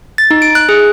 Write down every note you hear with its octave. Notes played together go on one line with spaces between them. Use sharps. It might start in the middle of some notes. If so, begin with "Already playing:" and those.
A6
D#4
D7
F#6
G#4